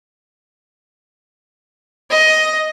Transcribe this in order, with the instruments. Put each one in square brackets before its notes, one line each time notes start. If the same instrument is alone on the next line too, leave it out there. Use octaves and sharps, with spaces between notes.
[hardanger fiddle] D#5